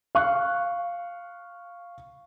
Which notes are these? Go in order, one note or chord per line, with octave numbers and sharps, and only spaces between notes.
F5 C#6 F#6